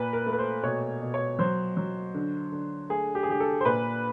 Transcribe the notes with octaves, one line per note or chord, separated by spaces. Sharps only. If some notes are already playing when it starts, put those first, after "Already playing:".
Already playing: A#2 B4
A#4
A3
B4
C5
B2 C#5
B2
C#5
F#3 C5
F#3
D3
D3
A3 G#4
G4
G#4
D3 G4
A4
C5
A#2 B4